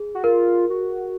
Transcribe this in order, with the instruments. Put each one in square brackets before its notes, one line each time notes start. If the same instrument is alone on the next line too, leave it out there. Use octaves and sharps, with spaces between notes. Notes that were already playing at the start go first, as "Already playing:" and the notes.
Already playing: [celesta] G#4
[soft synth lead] F#4
[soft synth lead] F4 [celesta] A#4
[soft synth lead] F#4